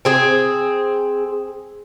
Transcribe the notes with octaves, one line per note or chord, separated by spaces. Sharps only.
C4 G#4